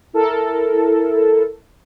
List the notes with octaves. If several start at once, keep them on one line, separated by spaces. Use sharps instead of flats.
E4 A4 A#4